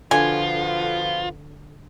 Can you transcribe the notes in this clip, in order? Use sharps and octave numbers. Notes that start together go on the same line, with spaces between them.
B2 D3 F3 B3 F4 G#5